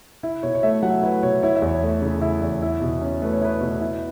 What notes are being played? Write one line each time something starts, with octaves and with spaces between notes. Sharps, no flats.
E4
B2 C#5
C#5
A3 E5
F#3 F#5
E4 B4
B2 C#5
E4 C#5
E5
E2
C#5
A3
C#3
E4
E2
E4
B2
C#4
A3 B4
C#5
E4 B4
B2
E4